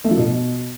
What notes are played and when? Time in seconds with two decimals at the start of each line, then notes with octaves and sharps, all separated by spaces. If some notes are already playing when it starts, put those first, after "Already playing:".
0.04 A3
0.11 F3
0.18 B2